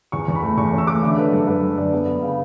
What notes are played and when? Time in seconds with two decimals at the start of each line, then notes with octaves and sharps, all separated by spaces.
0.12 E2 C#6
0.28 E2
0.35 B5
0.43 A3
0.57 E2 C#6
0.73 C#4
0.78 E6
0.87 A3 D6
1.03 D3 E5
1.11 A4
1.18 D3 B4
1.32 F#2 A4
1.47 F#2 B4
1.63 F#2
1.77 D3 D5
1.93 B3
2.08 B3
2.22 C#3